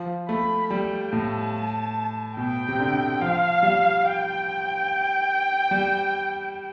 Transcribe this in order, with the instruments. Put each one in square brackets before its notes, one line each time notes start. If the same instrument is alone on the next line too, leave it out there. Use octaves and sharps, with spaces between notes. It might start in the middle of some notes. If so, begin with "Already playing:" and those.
Already playing: [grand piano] F3
[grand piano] A3 [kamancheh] B5
[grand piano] G3 [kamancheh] G5
[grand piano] A2 [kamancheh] A5
[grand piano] B2 [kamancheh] G5
[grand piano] C3
D3
[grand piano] F3 [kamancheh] F5
[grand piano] G3
[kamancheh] G5
[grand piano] G3